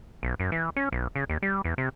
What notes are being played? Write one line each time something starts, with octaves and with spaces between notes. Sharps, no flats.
B1
F#2
E3
C#4
B1
C#3
D#2
G3
E2
C3